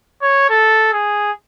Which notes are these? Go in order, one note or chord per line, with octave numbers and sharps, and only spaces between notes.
C#5
A4
G#4